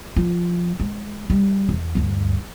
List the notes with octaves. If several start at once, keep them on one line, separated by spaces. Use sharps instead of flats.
F3
G#3
G3
E2
D2 G2